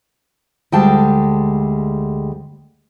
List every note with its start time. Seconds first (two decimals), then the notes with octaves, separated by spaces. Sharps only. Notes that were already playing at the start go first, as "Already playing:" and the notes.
0.72 D2 G3 G#3 G5 A5